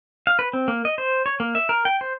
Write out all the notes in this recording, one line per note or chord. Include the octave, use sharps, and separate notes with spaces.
F5
B4
C4
A#3
D#5
C5
C#5
A#3
E5
A#4
G5
C5